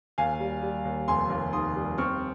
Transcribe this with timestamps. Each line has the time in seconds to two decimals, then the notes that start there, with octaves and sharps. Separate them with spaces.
0.18 D#2 F5 G#5
0.40 G3
0.63 G3
0.85 D#2
1.08 F1 G#5 C6
1.30 D#2
1.53 D#3 C6 D#6
1.76 G3
1.98 C4 C#6 F6